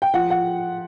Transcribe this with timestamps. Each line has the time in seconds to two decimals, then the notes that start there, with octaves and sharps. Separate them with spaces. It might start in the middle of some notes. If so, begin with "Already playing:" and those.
0.02 G5
0.14 F3 F#5
0.30 F#5